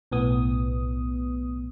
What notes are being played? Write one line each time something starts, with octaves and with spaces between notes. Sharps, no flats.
B1 A2 B3 D#6